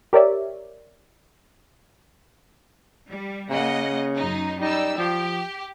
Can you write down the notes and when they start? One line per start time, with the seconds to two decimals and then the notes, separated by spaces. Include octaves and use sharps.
0.13 G4 A#4 C#5 D5 E5
3.09 G3
3.50 C#3 A#3 D#5 F#5
4.16 F#2 D#4
4.62 G3 D#4 E6
4.98 F3 G4